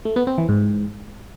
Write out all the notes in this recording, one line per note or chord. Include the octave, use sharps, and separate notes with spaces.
A3
B3
C4
E3
G#2